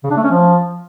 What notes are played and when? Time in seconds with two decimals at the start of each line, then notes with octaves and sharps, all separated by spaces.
0.04 C#3
0.10 D4
0.17 A3
0.24 C#4
0.31 F3